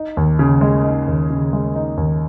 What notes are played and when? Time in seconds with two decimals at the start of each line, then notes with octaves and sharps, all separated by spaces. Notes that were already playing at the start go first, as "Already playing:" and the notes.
Already playing: D#4
0.17 D#2
0.39 C#3
0.61 G#3
0.84 D#4
1.07 D#2
1.30 C#3
1.53 G#3
1.75 D#4
1.97 D#2